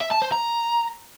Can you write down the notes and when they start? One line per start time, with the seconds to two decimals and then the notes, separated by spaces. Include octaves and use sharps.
0.01 E5
0.11 A5
0.22 C5
0.32 A#5